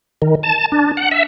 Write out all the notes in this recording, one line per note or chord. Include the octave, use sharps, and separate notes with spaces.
D#3
A5
D4
F#5
E5